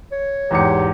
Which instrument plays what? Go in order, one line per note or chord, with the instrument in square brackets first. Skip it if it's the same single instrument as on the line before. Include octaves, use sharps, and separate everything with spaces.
[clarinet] C#5
[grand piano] E2 G#2 C#7 [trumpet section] G4